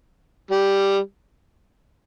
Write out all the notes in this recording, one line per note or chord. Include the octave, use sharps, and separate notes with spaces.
G3